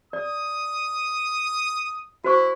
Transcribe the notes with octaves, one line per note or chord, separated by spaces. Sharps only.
D5 D#6
E4 F#4 C5 C#6